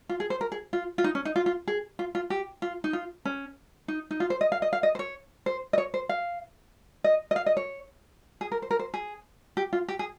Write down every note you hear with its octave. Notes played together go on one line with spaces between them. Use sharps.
F4
G#4
C5
A#4
G#4
F4
F4
D#4
C#4
D#4
F4
F4
G#4
F4
F4
G4
F4
D#4
F4
C#4
D#4
D#4
F4
C5
D#5
F5
D#5
F5
D#5
C5
C#5
C5
D#5
C#5
C5
F5
D#5
D#5
F5
D#5
C#5
G#4
A#4
C5
A#4
C5
G#4
G4
F4
G4
G#4